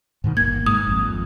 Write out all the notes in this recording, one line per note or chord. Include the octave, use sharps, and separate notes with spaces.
G#2 B2 D#3
G1 A#3 G#6
G#2 D#6
G#1 F2